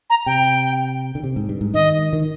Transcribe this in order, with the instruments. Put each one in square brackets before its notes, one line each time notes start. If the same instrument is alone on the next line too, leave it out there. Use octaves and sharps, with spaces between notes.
[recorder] A#5
[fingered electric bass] C3 [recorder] G5
[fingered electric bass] D3
C3
G#2
G2
G#2
[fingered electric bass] D#3 [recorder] D#5
[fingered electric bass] D#3